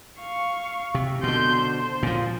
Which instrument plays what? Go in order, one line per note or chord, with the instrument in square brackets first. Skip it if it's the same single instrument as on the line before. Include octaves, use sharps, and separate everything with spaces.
[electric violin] F5 C#6
[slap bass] C3
[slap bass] B2 D3 [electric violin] C6 G6
[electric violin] C5
[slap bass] A#2 F3